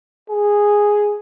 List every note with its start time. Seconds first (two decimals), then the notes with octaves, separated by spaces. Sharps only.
0.29 G#4